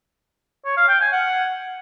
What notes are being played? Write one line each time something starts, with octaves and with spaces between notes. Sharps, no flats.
C#5
F5
G5
G#5
F#5